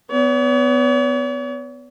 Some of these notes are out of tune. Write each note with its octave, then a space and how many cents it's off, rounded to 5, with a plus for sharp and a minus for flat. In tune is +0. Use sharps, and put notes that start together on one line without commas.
B3 +20 C#5 +45